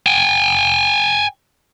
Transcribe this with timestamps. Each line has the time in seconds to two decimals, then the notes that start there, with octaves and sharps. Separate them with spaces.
0.06 G5 G#5